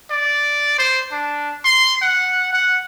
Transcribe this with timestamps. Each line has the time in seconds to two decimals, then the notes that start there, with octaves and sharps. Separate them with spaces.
0.11 D5
0.79 C5
1.12 D4
1.65 C6
2.02 F#5
2.53 F#5